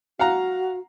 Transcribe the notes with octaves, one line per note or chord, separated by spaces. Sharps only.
F#4 F5 F#5 A#5